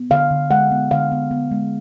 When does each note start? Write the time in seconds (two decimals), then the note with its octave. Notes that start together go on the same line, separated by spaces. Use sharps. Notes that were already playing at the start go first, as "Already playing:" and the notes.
Already playing: B3
0.10 D3 F5
0.31 D3
0.51 G#3 F#5
0.71 B3
0.91 D3 F5
1.12 B3
1.31 B3
1.51 G#3